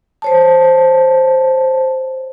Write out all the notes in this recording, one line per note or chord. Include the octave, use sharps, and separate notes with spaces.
C5 C#5 A5